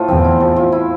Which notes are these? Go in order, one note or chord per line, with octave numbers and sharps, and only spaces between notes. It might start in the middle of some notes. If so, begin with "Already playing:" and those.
Already playing: A2 F3
E2 C4
E4
F3
F3
E4